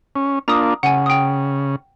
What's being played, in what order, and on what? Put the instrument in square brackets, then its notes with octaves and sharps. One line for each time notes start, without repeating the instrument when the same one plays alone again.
[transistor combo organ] C#4
[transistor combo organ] A#3 D4 F4 [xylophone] A#5 D#6
[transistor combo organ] C#3 [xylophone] F#5 G#5
[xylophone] G5 D#6